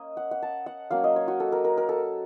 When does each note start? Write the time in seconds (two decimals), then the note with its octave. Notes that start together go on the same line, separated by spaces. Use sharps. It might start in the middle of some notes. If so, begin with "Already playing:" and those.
Already playing: A#3 C#4 D#5
0.17 F#5
0.31 F#5
0.42 A5
0.66 F#5
0.91 F#3 A#3 C#4 F5
1.04 D#5
1.16 C#5
1.28 F#4
1.40 A4
1.52 A#4
1.64 A#4
1.77 A#4
1.89 A4